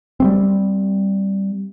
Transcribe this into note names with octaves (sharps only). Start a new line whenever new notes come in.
G3 A3 C4